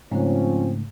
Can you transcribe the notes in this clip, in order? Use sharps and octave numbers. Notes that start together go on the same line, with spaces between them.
G#2 C#3 F3 A3 C4 C#4